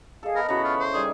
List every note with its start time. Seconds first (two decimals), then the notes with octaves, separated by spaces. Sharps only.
0.23 G#4 A4 D#5 F5
0.35 B3 A#4
0.48 C#3 E3 B3 F#4 C#5 A#5
0.64 F4 C#6
0.80 C5
0.94 D#3 G3 G#4